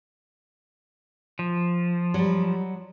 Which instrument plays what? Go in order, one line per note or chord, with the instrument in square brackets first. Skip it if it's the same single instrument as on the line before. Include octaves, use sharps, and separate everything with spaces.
[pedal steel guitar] F3
[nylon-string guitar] F#3 G3